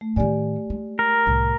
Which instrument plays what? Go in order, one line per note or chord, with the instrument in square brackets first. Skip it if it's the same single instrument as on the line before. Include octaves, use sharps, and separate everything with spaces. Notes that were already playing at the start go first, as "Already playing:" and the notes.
[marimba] A3
[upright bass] A2 D#3 [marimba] G4 D5 G#5
[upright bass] G#3
[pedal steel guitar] A#4
[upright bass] C2 A2